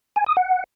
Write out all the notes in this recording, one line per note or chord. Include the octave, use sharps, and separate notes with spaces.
G#5
D#6
F#5